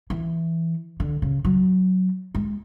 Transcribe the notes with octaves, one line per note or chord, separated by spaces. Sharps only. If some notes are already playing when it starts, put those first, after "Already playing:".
E3
D3
C#3
F#3
G#3